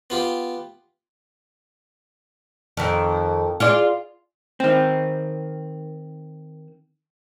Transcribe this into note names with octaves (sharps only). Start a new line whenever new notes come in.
B3 F4 G4
F2 D#3
F4 G#4 D5
D#3 C4